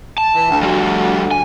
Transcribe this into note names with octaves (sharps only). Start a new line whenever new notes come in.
A5
E3
D2
G3 F#4
G#5